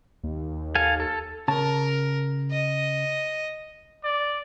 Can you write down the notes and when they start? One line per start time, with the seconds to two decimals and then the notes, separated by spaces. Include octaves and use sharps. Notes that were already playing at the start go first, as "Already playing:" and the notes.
0.23 D#2
0.75 A4 F5 G#5
1.00 A4
1.48 C#3 A#4 A5
2.51 D#5
4.04 D5